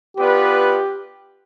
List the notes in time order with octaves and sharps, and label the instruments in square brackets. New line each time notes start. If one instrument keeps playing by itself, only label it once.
[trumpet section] B3 F4 B4 D5 [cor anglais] G4